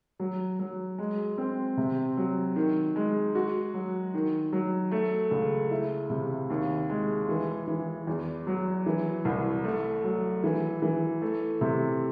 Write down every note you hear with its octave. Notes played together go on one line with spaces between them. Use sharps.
F#3
F#3
G#3
C4
C3
F#3
D#3
G#3
F#4
F#3
D#3
F#3
A3
C#2
E4
C3
D#2
G#3
E3
E3
E2
F#3
E3
C2
A3
F#3
E3
E3
A3
C3